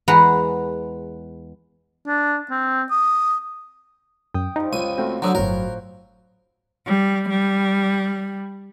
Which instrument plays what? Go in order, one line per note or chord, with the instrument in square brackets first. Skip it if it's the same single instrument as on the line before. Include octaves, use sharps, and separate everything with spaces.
[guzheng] E2 G#3 B4 F#5 A#5
[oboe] D4
C4
D#6
[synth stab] F#2 [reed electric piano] G5 D#6
[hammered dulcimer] F3 G3 [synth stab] D#4
[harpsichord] C#2 [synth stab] D#7
[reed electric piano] A3 C4 F#4 [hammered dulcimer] F4 G5
[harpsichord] D3 F#3 [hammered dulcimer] F3 B4 C#5 [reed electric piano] A#5 D#6 E6
[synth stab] G1 F#3 [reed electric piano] A2 [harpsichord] A#4
[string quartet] G3
G3